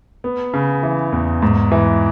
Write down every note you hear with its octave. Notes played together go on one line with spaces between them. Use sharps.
B3
C#3
E3
E2
G#2
E3